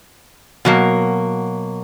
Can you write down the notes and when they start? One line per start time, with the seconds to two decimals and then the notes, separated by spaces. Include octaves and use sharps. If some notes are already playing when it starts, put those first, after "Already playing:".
0.65 B2 F#3 A#3